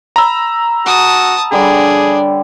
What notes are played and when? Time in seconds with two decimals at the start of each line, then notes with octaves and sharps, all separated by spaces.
0.16 A#5 B5 E6
0.86 F#4 F#5 A5 D#6
1.52 D3 G3 D4 G#4 C#5